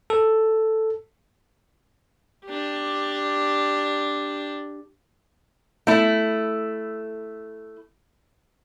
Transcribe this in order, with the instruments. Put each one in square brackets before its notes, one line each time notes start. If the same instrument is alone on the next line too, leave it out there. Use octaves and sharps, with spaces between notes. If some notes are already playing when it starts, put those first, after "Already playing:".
[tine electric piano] A4
[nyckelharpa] D4 G4
[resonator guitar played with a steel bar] A3 E4